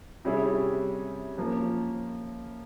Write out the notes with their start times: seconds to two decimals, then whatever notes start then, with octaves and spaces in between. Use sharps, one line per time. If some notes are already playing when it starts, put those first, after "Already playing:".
0.25 C3 G3 C#4 E4 G#4
1.38 F3 A#3 C#4